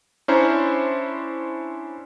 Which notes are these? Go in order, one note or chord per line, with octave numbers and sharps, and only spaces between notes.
C#4 D4 E4 C5 A#5